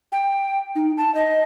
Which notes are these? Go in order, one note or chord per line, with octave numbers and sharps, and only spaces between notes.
G5
D#4
A5
D#5